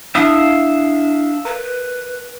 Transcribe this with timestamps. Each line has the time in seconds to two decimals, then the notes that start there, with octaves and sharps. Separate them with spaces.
0.15 D4 E4 E5 F5 D#6
1.45 A#4 B4